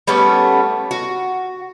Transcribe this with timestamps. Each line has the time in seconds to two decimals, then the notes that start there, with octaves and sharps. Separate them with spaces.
0.07 G3 A3 B3 C#4
0.91 F#4